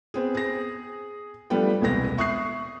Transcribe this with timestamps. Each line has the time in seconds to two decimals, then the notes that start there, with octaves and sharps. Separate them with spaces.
0.14 B3 C4 G#4
0.35 G#4 A#6
1.50 F3 G3 A3 B3 D4 G5
1.81 E1 C2 G#3 B3 A#6
2.17 E5 C#6 D#6 F#6 C7